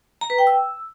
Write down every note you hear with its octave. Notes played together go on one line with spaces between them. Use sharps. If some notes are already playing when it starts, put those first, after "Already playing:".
A#5
B4
G5
E6